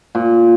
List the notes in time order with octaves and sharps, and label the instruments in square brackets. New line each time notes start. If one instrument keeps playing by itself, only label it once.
[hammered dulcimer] A#2